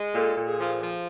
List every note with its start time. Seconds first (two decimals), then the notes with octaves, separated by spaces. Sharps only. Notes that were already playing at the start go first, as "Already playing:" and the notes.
Already playing: G#3
0.14 A#2 A4
0.36 A#2
0.46 G#4
0.58 F3
0.80 F3